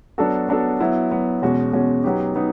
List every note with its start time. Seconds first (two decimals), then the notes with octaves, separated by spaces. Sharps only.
0.18 F#3 B3 D4 F#4 A4
0.48 F#3 B3 D4 F#4 A4
0.80 F#3 B3 E4
1.11 F#3 B3 E4
1.42 E2 B2 G#3 C#4 F#4
1.73 E2 B2 G#3 C#4 F#4
2.04 F#3 B3 D#4 G4
2.35 F#3 B3 D#4 G4